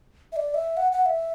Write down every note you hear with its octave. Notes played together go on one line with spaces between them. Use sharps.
E5
D5
E5
F#5
F#5
E5